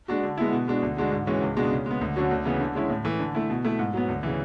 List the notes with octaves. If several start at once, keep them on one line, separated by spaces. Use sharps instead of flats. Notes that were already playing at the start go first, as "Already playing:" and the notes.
G#3 D4 F#4
D3
G#3 B3 E4
B2
G#3 D4 F#4
D2
D3 G#3 D4 F#4
G#2
E3 G#3 C#4 F#4
C#2
B2 G#3 D4 F#4
C#3
G#3 B3
D2
D3 F#3 C#4 F#4
D2
C#3 E3 B3
D3
G#3 C#4 E4
A2
E3 A3
D3
A3 E4
B2
A3 E4
G#2
F#3 B3
D2
C#3 E3